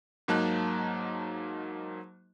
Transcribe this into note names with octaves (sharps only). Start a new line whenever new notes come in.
G#2 F#3 A#3 D#4 A5 F#6